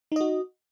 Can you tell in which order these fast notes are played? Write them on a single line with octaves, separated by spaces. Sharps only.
D#4 D#5 F#4